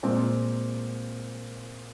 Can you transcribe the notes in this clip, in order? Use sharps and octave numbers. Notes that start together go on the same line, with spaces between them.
A#2 G#3 C4